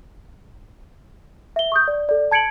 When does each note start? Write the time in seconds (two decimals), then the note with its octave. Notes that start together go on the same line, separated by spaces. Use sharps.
1.56 E5 G7
1.72 C#6 D#6 G6
1.88 D5
2.09 A4 D5
2.31 A5 G#6 C#7 D7 F#7